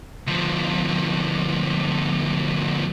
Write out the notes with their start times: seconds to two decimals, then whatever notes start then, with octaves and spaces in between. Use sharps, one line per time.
0.27 D2 F3